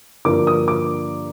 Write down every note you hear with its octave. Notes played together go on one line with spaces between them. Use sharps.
G2 D3 F3 A#3 D6
D#6
D6